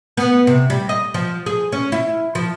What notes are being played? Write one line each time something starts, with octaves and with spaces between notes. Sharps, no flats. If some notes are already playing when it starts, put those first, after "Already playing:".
B3
C3
G3
D#5
F3
G#4
C#4
E4
F3